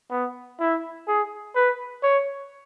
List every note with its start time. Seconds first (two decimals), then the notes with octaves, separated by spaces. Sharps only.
0.11 B3
0.60 E4
1.08 G#4
1.55 B4
2.03 C#5